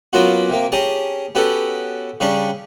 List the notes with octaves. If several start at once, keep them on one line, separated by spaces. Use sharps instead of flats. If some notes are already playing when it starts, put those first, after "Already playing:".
F#3 A#3 B3 C#4 F4 F#4
C3 A#3
C#4 G4 G#4 A5 A#5
B3 C#4 F#4 G4 A4
C#3 G3 C#4 D4 C#6